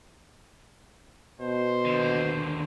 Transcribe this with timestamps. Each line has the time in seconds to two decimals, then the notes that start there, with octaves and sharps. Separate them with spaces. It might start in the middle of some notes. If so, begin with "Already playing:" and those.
1.41 B2 C5
1.85 D#2 D3